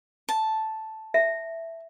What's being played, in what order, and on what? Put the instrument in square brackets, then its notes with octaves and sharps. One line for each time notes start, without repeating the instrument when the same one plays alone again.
[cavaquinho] A5
[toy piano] E5